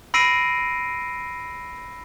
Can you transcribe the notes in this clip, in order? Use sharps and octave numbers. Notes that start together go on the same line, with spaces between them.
B5 E6 A#6 C7 D7 D#7